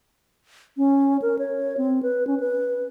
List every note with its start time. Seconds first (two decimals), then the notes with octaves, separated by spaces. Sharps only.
0.77 C#4
1.22 A#4
1.39 C#5
1.77 C4
2.03 B4
2.27 C#4
2.40 B4